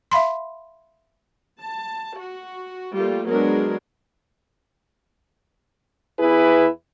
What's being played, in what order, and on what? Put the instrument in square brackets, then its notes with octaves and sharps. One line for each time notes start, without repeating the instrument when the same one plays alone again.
[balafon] E5 F5 B5 C6
[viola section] A5
F#4
G3 A3 A#3 F4
F#3 G#3 B3 D4 G#4 A#4
[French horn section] E2 E4 G#4 B4